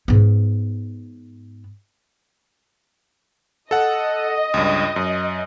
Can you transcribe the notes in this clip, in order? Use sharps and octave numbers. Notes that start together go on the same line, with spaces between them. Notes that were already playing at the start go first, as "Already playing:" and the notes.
G#2 B3
A4 D#5 F#5
C#2 G2
F#2